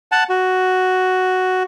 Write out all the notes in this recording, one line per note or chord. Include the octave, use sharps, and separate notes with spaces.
F#5 A5
F#4